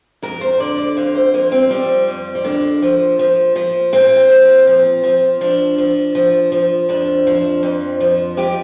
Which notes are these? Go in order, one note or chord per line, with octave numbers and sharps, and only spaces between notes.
F2 A#4
C5
D3 D5
D5
F2 F5
C5
F3 A#3
C4
F3 G3
F2
G3
D3 A#3
F3
F3
F3
A#2 C4
F3
F3
F3
F3 D4
F3
F3
F3
F2 D4
F3
F2
F3
F3 G4